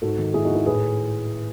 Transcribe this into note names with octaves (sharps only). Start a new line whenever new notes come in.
G#2 F#4 A4
D#3
G#2 E4 G#4
D#4 F#4
D#3
E4 G#4
A2 G#4 B4